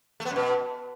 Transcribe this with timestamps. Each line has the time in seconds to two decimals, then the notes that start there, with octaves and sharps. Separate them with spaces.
0.20 A3
0.25 B3
0.31 F#2
0.36 B2